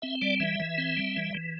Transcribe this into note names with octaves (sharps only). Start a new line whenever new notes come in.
C4 E5
G3 D5
E3 E5
E3
C4
G3
E3
E3